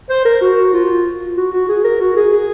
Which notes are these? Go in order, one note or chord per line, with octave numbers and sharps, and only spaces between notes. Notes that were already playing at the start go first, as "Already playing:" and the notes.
C5
A#4
F#4
F4
F#4
F#4
G#4
A#4
F#4
G#4
G#4